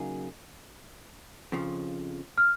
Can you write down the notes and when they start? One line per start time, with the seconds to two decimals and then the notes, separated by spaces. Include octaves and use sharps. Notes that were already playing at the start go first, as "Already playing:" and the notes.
Already playing: C#3 F#3 A#3 D#4 G#4
1.52 F2 C#3 F3
2.38 F6